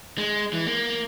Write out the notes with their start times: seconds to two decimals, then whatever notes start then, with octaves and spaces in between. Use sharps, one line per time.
0.18 G#3
0.53 E3
0.66 A#3